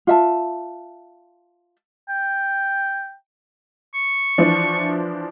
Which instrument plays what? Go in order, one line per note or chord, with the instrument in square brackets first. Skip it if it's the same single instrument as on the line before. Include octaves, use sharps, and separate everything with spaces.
[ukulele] F4 E5 A5
[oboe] G5
[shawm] C#6
[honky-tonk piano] E3 F3 D4